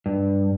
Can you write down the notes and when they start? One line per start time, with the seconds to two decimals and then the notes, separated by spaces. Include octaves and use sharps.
0.06 G2